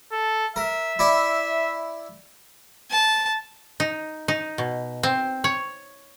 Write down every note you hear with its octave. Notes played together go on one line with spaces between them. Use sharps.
A4
A#4 E5
E4 D5
A5
D#4
D#4
B2
C4
C#5